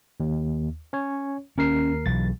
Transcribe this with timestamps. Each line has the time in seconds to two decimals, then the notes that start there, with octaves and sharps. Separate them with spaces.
0.20 D#2
0.93 C#4 C#5
1.58 D#2 C#4 A#4 C7
2.06 B1 E3 F#3 A6